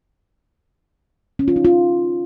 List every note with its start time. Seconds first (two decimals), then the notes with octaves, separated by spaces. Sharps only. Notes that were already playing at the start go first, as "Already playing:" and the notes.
1.39 C#4
1.48 F4
1.56 D#4
1.65 F4